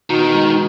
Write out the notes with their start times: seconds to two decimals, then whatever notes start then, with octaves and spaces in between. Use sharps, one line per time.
0.10 B2 D#3
0.34 G#3